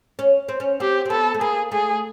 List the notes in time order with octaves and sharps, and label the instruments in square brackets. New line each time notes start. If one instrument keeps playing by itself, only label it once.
[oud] C#4
C4
C#4
[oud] C4 [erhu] G4
[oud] C4
[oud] B3 [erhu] A4
[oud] A3
[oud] A#3 [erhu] G#4
[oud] A3 [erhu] G#4